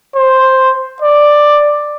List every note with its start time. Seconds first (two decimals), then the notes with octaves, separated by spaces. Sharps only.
0.16 C5
1.02 D5